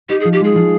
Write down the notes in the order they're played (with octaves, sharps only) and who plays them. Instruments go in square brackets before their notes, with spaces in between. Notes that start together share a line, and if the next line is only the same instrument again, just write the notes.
[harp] D#4 [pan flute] G4
[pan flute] G#4
[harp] F3
[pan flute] G4
[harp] G#3 [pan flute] G#4
[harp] F3